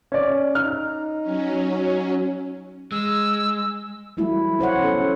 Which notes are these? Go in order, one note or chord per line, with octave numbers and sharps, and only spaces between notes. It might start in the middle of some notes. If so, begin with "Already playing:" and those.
C#4 D5
D#4 F6
F#3 C#4
G#3 E6
F#3 G3 A3 E4
C#4 C5 C#5 F#5
B3 C#4 A4